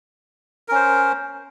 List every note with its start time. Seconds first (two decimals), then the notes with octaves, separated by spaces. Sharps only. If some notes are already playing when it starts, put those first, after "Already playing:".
0.68 A#4
0.72 C#4
0.75 C5